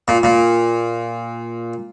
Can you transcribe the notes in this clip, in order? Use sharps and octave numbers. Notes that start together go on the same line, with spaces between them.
A#2
A#2